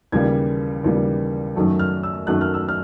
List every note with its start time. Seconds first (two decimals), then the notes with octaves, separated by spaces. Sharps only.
0.12 D#2 C#3 E3 G3 G#6
0.84 D#2 C#3 E3 G3
1.56 F#2 D#3 F#3 A3
1.79 F6
2.03 E6
2.27 F#2 D#3 F#3 A3 F#6
2.41 F6
2.54 E6
2.69 F6